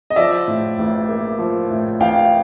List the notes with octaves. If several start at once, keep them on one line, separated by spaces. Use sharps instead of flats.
D#5
F3 D5 E5
A2
A1
A#3
F3
A2
A1 F5 G5